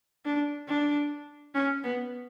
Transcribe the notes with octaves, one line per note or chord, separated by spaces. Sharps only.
D4
D4
C#4
B3